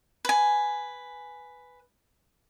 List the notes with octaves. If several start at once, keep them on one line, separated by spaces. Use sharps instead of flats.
B4 G#5